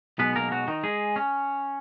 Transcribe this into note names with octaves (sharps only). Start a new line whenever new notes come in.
B1 B2 G#3 B3 B4
A#3 A#4
F#3 F#4
D#3 D#4
G#3 G#4
C#4